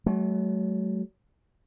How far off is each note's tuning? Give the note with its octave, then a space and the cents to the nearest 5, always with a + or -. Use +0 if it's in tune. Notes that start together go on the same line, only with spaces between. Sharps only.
F#3 +25 A3 -40